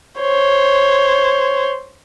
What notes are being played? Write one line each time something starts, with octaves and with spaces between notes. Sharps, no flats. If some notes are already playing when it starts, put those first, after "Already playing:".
C5 C#5